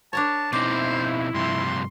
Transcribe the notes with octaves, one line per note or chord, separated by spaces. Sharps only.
D4 A#4 C#5 A5
B2 C4 D#4 E4 C5 D5
G2 C3 F3 C6